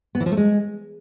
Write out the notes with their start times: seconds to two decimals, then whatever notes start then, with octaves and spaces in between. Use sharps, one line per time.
0.15 B3
0.20 E3
0.26 F3
0.32 A3
0.37 G#3